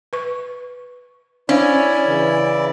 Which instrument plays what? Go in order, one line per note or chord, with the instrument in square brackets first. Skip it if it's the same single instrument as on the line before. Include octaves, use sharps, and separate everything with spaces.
[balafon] B4 C#6
[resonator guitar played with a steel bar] C#4 [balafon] D4 C5 F5 [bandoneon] E4 D5
[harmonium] C#3 E3